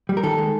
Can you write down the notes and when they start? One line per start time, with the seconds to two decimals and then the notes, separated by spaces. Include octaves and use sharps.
0.09 G3
0.17 A#4
0.23 D#3 A4
0.38 G#3